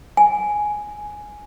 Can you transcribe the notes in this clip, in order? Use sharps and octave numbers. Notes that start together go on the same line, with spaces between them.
G#5